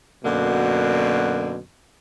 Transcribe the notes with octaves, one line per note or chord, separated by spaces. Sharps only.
F#2 B2 D3 A#3